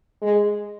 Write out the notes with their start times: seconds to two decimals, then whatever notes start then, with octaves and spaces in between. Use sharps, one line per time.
0.22 G#3